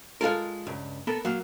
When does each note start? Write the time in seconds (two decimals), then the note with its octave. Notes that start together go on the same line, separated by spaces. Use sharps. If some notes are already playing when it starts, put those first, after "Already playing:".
0.21 G#3 F4 A4 A#4
0.67 C#2 G2
1.07 B3 A4 A#4
1.25 F#3 A#3